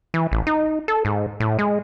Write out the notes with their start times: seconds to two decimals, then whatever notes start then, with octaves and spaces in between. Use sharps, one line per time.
0.14 E3
0.32 A1
0.47 D#4
0.88 A4
1.05 G#2
1.40 A2
1.59 G#3